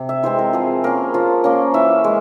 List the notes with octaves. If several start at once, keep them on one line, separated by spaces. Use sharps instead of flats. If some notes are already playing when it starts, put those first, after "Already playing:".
Already playing: C3
E5
E3 G#3 C4 C5
A#4
F3 G#4
A#3 C#4 A#4
F3 F4
A#3 C#4
E3 E5
G#3